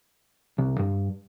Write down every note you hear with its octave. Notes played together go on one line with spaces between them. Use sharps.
C2
G2